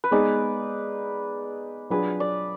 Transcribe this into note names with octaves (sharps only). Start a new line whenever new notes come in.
B4
G#3 B3 D#4 G#4 D5
F#3 D4 F4 G#4 B4
D5